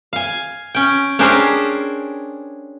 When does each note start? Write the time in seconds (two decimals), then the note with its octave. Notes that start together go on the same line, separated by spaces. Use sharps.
0.13 F5 G#5
0.75 C#4 G5
1.19 C#4 D4 G4 G#4 A#4 C5